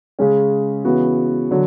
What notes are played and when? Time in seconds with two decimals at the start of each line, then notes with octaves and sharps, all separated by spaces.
0.19 C#3 G#3 C#4
0.85 C#3 E3 B3 F#4
1.51 D3 F#3